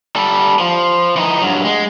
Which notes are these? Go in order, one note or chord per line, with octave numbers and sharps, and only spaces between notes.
G3 A4
F3
E3 D#4
G2 F#3
G#3